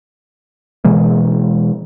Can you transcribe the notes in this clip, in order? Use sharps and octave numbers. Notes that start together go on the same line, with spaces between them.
B2 E3 G#3 A#3